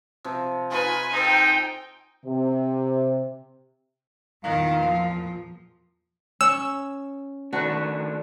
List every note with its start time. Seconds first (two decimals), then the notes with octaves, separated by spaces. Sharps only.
0.24 C3 F3
0.71 D#4 F4 G#4 B4 G#5
1.13 D#4 G#4 A4 C5 G5
2.25 C3
4.43 E2 A#2 D#3 F5
4.81 F3
6.41 C#4 E6
7.53 D#3 A3 D4 F#4 B4